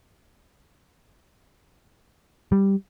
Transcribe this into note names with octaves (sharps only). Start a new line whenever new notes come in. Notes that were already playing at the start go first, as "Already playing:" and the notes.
G3